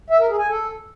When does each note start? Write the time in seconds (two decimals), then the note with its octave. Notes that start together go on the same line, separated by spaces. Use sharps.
0.10 E5
0.20 A#4
0.29 G#4
0.38 G#5
0.48 A4